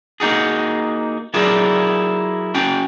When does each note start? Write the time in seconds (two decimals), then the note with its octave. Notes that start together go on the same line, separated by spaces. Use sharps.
0.20 A#3 D#4 F#4 G#4
1.34 F#3 E4 F4 G#4 A#4 D5
2.55 C#4 F#4 G5